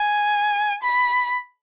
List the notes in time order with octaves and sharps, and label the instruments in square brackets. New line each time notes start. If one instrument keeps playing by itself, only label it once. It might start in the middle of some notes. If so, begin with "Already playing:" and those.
Already playing: [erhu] G#5
B5